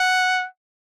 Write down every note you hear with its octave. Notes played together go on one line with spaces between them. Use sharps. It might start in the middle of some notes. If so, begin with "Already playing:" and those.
Already playing: F#5